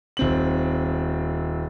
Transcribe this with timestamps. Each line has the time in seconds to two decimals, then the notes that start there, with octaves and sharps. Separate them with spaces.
0.17 D#1 C4 F#7